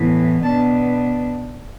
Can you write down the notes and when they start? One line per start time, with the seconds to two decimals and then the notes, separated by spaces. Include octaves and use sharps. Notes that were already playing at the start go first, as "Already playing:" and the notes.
Already playing: A2 E3 B3
0.44 B2 B3 D4 A5